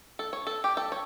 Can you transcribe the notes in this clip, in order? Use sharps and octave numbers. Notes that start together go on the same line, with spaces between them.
A4
C#5
A4
G4
A4
C#5